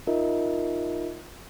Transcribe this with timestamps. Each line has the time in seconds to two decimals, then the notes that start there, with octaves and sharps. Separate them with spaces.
0.07 D#4 F4 A#4 D#5 E5